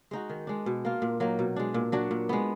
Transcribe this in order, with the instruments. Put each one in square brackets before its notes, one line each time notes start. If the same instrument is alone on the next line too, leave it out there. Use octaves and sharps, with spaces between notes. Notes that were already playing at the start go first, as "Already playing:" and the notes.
[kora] G#3 D#4 F#4
D#3
G#3 D4
B2
A#3 F4
A#2
F#3 A#3 D#4
B2
G#3 D4
A#2
F#3 D4 F#4
A#2
G#3 B3